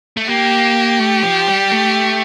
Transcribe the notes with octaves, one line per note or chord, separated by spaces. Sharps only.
A3
A#3 G4
A3
F3
G3
A3